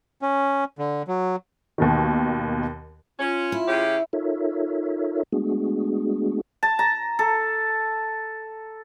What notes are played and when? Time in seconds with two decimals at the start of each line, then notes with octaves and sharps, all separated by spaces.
0.22 C#4
0.79 D3
1.08 F#3
1.78 D#2 B2 D#3
3.19 C#4 F4
3.52 E4
3.68 C#3 C#4 G4
4.13 D#4 F4 A4 A#4 C#5 E5
5.33 G#3 A3 B3 D4 F#4 G#4
6.63 A5
6.79 A#5
7.19 A4